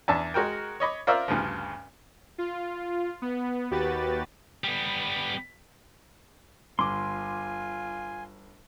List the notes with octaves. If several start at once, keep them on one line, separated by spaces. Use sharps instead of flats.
E2 D4 E5 A5
G#3 F#4 A#4 G5
C#5 D#5 B5 D6
F4 A#4 C5 D5 E5
D2 G2 C#3 F3
F4
B3
D#2 F#4 G4 B4 A6
G3 B3
G1 F4 G#5 C6 D6